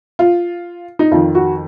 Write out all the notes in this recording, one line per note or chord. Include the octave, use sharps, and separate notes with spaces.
F4
D#4
F2 D#3 F4
F#4